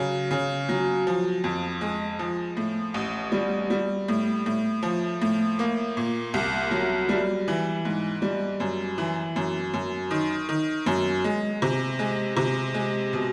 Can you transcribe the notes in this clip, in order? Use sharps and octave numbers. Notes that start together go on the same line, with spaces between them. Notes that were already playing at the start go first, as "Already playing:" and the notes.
Already playing: C#3 F#3
C#3
F#3
F3
F2
G#3
F3
A2
A1
G3
G3
A2
A2
F3
A2
A#3
A#2
C2
F#3
G3
E3
G#2
G3
F#2
E3
F#2
F#2
D#3
D#3
F#2
G#3
C3
G#3
C3
G#3
B2